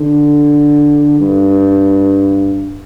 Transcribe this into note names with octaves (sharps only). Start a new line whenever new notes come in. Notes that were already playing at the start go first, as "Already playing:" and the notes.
Already playing: D3
G2